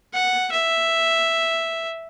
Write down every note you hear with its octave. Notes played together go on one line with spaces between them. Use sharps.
F#5
E5